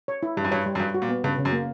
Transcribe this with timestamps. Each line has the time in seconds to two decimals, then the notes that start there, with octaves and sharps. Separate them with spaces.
0.08 C#5
0.23 E4
0.37 G2 G3
0.44 F#2
0.51 G2 C#5
0.66 G3
0.75 F#2
0.80 G2 G3
0.94 F#4
1.02 A#2
1.09 B3
1.24 G2 C#3
1.38 C#3
1.45 F#2
1.52 A#3